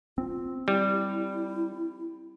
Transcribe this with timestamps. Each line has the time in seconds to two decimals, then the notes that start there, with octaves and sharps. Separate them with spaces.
0.18 C4 F4
0.68 G3 E4